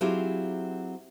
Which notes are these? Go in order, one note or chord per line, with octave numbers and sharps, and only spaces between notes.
F#3 C4 E4 F4 G4 G#4